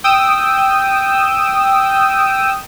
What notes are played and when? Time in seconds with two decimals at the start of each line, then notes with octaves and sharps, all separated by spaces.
0.04 G5 D#6 E6